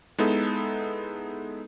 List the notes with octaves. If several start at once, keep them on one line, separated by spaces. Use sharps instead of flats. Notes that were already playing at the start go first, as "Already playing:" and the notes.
G#3 B3 D#4 E4 A4